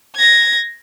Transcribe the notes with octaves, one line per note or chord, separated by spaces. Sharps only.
G#6 A#6